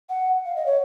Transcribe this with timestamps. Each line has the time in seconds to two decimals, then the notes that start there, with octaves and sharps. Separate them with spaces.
0.09 F#5
0.45 F5
0.56 D#5
0.66 C#5